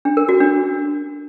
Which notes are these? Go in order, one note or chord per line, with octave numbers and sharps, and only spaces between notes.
D4
A#4
F#4
D4